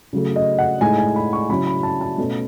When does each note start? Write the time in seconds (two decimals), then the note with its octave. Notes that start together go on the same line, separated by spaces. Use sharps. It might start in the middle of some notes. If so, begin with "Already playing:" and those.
0.13 C#3 F#3 A3
0.36 D#5
0.59 F#5
0.81 A2 G#3 D#4 G#5
0.98 G#5
1.16 B5
1.33 C#6
1.49 C#3 F#3 C#4 E4 B5
1.67 B5
1.83 A5
2.01 A5
2.18 B2 A3 C#4